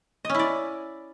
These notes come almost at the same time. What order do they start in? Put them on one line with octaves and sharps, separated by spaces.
D#5 C#4 E4 D5